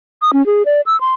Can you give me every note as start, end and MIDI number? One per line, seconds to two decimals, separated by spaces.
0.22 0.31 87
0.33 0.45 61
0.46 0.63 68
0.66 0.81 74
0.86 0.99 88
1.01 1.14 84